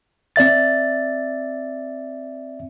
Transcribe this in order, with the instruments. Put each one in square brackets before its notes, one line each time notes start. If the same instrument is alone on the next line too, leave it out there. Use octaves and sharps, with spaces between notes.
[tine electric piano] C4 D5 E5 A6